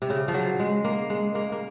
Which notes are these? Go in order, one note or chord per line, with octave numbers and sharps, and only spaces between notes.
C3
C#3
F3
F#3
G#3
A#3
G#3
A#3
A#3